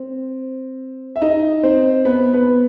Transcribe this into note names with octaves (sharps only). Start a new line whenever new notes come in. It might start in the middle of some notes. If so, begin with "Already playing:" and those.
Already playing: C4
E5
D#4 D#5
C4 C5
B3 B4
B3 B4